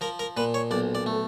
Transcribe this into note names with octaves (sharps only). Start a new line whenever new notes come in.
F3 A#4
A#4
A#2 B4
C#5
B1 D5
D5
A3